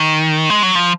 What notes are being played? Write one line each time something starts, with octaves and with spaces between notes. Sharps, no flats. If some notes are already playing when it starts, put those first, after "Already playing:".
Already playing: D#3
G#3
F#3
F3